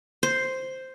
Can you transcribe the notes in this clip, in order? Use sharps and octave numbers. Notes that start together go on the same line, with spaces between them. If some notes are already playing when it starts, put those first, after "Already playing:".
C5